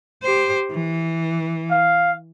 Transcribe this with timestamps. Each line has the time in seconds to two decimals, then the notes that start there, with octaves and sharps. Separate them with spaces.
0.23 G4 C5
0.72 E3
1.70 F5